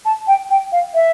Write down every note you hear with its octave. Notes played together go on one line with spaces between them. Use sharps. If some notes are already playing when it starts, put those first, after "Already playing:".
A5
G5
G5
F5
E5